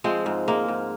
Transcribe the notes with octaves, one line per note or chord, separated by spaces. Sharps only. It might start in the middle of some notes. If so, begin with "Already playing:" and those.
F3 G#3 C4
G#2
G#3 A#3
G#2